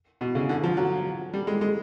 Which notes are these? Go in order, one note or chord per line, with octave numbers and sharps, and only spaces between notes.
B2
C#3
D3
F3
F#3
G3
G#3
G#3